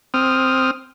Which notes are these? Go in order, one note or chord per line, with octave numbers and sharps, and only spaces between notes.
C4 D#6 F6